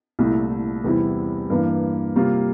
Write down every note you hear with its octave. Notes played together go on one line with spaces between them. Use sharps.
C2 A#2 A3 E4
E2 C3 G3 C4 E4
G2 E3 A#3
C3 G3 A#3 F4